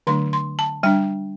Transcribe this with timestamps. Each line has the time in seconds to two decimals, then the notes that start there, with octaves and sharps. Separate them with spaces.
0.07 D3 F#3 A3 D4 C6
0.33 C6
0.59 A5
0.83 G3 D4 G5